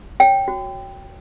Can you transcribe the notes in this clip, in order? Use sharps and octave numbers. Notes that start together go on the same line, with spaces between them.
C#5 G5
F#4